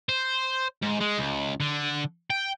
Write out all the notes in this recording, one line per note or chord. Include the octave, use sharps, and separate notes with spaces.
C5
G#2
G#3
C#2
D3
G5